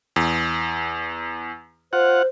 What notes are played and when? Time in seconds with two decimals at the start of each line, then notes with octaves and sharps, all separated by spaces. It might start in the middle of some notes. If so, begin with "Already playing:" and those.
0.16 E2
1.93 F4 C5 F#5